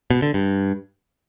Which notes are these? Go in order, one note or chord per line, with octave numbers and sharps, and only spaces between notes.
B2
D3
G2